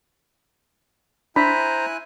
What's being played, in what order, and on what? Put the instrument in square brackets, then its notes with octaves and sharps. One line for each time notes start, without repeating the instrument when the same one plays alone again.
[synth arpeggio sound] D4 [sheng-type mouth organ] E4 G#5 F#6 [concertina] C5 A#5 [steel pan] B5